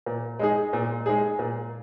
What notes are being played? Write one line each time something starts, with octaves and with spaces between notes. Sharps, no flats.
A#2
G#3 D#4 G#4
A#2
G#3 D#4 G#4
A#2